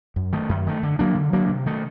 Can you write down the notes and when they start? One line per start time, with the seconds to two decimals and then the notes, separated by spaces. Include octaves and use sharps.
0.16 F#2
0.33 D#3 A3
0.49 F#2
0.67 D#3 A3
0.83 D3
0.99 F#3 A#3 D4
1.15 D3
1.33 F#3 A#3 D4
1.49 C3
1.66 D#3 A3